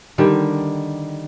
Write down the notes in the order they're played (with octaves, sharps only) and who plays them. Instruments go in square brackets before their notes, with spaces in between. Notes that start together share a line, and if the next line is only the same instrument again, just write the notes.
[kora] D3 D#3 G3